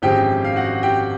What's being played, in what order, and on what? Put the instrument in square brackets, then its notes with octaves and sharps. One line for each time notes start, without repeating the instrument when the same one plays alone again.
[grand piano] G#1 F#2 D3 F3 G#3 G4 G5
F5
F#4 F#5
G4 G5